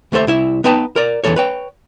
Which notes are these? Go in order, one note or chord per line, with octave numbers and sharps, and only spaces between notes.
D#2 A3 A4 C5 E5
C2 E4 E5
B3 D#4 B4 G5 A5
A#4 D5
E2 C3 E3 A4 C#5
B4 C#5 G5